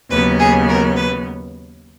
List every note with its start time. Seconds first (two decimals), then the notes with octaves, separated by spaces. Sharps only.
0.10 D#2 C#3 F#3 B3 B4
0.39 G#4
0.68 A#4
0.96 B4